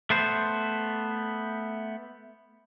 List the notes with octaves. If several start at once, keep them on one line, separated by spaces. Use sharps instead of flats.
A3 B3 C5